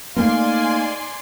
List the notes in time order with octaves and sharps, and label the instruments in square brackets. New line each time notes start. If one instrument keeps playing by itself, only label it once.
[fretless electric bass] A3 A#3 [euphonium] D#4 [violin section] D5 G#5 C6 [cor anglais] F5